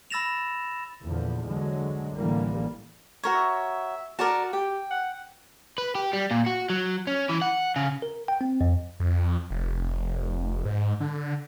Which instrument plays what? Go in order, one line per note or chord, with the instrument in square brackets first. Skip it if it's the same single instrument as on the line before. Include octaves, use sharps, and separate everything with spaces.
[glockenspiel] B5 E6 A6 A#6 E7 F7
[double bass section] E2 A#2 D3 F3
D3 F#3 G#3
A1 D3 E3 G3 A#3
[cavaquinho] F#4 A#4 C#5
[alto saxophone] E5
[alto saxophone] F#4 [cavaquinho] A#4 D5 A5
[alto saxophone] G4 [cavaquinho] G5
[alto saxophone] F#5
[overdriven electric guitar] B4
G4
G3
A#2
F#4
F#3
C#4
E3
F#5
C#3
[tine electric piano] A#4
G5
C4
F2
[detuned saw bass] F2
F1
G#2
D3